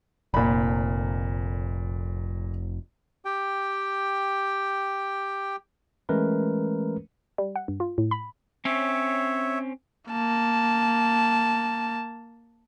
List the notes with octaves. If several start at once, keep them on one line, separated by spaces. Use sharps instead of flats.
F1 A#2 B5
G4 G5
E3 G#3 A3 C#4 A#4 B4
G3
F#5
G2
F4
A2
B5
C4 C#4 C#5 E5
A#3 A5